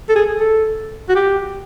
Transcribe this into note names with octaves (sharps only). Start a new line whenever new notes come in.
A4
G#4
A4
F#4
G4